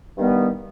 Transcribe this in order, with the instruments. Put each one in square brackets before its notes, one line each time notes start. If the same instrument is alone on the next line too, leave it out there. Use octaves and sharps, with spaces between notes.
[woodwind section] G2 D#3 G3 B3